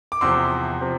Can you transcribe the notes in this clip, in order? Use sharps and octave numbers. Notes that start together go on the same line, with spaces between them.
D6
E2 C3 F3 C6 E6
C3 F3